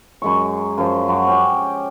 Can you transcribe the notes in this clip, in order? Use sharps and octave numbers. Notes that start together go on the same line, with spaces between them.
F#2 G#3 C#6
F#2 F3 C5
F#2 F#4 D6
C#4 G4 G5